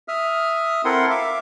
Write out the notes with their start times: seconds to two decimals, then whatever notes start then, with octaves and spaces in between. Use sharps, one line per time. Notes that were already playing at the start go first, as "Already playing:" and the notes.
0.08 E5 D#6 F6
0.85 C4 E4 A4 A#4 F#5 C6
1.10 E5 F5 D6